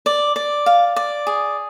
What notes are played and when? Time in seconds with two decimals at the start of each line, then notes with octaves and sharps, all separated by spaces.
0.06 D5
0.36 D5
0.66 F5
0.96 D5
1.27 G#4